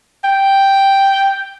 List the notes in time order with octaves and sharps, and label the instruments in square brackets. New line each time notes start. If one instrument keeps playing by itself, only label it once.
[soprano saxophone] G5